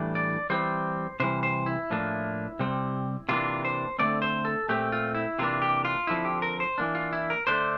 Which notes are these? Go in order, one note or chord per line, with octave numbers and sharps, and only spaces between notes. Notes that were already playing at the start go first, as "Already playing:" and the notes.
Already playing: A2 E3 G3 D4
D5
E3 G3 C4 C5
C3 E3 G3 C5
C5
E4
A2 F3 A#3 D4
C3 G3 C4
C3 E3 A#3 D4 F4
C5
D3 A3 C4 D5
C5
A4
A#2 A3 C4 G4
F4
E4
C3 E3 A#3 D4 F4
G4
F4
D3 F3 C4 E4
G4
A#4
C5
E3 A#3 D4
F4
E4
A#4
D3 A3 D4 C5